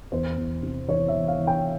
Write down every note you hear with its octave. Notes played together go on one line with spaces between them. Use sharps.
E2 C5
E2
C3
E3 C#5
E5
E3
F5
E3
G5